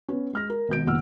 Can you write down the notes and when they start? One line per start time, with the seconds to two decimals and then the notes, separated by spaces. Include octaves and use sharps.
0.08 B3 C#4
0.33 G#3 F6 A#6
0.50 A#4
0.69 G#1 B2 G6 D7
0.86 F1 A#2 D#3 F#5 E6 F6